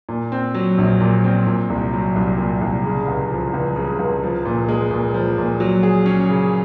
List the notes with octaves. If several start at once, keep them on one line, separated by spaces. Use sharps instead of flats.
A#2
C4
F#3
A#1
A#2
C4
A#2
C2
F#3
C2
A#2
C2
C#3
C#2
F3
C#2
C#3
C#2
F3
A#2
G#3
A#2
F3
A#2
F#3
G#4
C#4
C#3